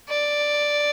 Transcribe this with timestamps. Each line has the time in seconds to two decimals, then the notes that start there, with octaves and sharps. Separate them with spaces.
0.09 D5